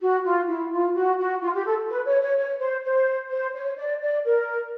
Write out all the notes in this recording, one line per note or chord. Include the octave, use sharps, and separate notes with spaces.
F#4
F4
E4
F4
F#4
F#4
F4
G4
A4
B4
C#5
C#5
C#5
C5
C5
C5
C#5
D5
D5
A#4